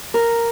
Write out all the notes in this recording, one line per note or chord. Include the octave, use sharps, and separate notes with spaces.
A#4